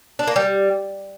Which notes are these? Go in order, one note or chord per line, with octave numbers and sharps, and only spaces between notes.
D4
A#3
G3